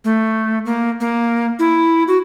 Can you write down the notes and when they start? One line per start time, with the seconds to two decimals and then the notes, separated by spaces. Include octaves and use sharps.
0.05 A3
0.65 A#3
1.01 A#3
1.59 E4
2.08 F#4